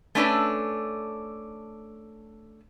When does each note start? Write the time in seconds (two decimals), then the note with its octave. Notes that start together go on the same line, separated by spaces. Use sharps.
0.15 A3 C#4 D4 A4 B4